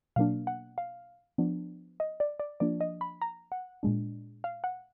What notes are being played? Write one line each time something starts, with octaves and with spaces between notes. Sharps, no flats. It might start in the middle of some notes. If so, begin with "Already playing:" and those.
B2 F#3 A#3 D4 F5
F#5
F5
F3 B3 D4
D#5
D5
D5
F3 A#3 D4 D5
D#5
B5
A#5
F#5
A#2 G#3 D4
F5
F#5